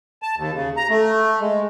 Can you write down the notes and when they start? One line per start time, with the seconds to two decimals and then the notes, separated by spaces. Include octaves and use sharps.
0.23 A5
0.37 D#2
0.54 C#3
0.77 A#5
0.90 A3
1.41 G#3